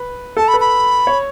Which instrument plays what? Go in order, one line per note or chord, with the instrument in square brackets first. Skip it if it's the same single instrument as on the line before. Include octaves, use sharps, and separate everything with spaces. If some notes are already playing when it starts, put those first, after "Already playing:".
Already playing: [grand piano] B4
[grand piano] A4 [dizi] A5
[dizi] B5
[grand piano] B4
[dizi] B5
[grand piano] C#5